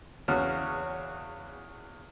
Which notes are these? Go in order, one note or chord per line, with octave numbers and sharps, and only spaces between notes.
E2 C#3 F#4 C#5 F6